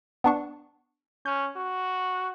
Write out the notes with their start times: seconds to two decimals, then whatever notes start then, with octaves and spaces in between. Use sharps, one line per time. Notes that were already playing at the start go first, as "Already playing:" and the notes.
0.24 B3 D4 C#6
1.26 C#4 G6
1.56 F#4